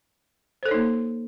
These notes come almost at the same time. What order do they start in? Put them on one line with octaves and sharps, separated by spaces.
C5 A4 C#5 D#4 A#3